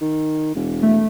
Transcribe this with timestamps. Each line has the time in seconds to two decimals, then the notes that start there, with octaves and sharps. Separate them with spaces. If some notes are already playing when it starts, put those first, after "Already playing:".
0.01 D#3
0.55 E1
0.83 A3